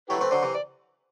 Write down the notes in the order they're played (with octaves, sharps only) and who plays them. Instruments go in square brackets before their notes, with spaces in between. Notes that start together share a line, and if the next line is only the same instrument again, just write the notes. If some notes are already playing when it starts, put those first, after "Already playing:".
[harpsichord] F#3 A3 [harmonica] E4 G4 B4
[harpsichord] A3 C4
[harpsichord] D3 F#3 [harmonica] C5
[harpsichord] C3 E3
[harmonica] D5